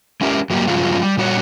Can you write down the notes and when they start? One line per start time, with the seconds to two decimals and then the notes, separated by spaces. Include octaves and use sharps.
0.21 G#3 C#4 E4 G4 A#4
0.50 G2 F#3 A#3 G4
0.68 G2 C#3 F3 F#3 G#3 F4
1.03 G3
1.17 A#2 G3 F#4 A#4 C#5